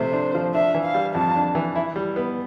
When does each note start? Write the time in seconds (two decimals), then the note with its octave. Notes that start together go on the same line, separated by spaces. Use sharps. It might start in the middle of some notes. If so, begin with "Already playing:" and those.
Already playing: C3 F3 A3 C5
0.13 D4
0.34 F3
0.54 D4 E5
0.74 E3
0.85 F5
0.94 G3
1.15 F2 A5
1.36 D4
1.55 E3
1.75 E4
1.96 G3
2.16 B3